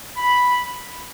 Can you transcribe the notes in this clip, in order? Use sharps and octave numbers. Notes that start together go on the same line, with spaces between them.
B5